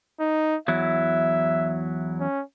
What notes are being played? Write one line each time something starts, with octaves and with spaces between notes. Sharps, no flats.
D#4
E2 F#3 E4 E5
C#4